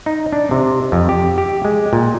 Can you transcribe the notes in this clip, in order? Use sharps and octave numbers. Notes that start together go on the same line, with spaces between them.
D#4
D4
C3
F2
G4
G4
G#3
A#2